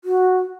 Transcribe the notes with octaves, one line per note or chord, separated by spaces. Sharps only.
F#4